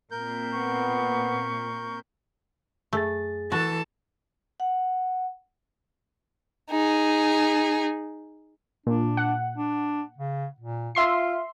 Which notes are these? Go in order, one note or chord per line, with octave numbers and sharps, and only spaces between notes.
A#2 C4 A#4 G6
B3 C#6
F#2 A3 G#4 A6
E3 F#4 A4 A5
F#5
D#4 G#4
A#2 D4
F#5
D4
C#3
A#2
F4 E5 C6 C7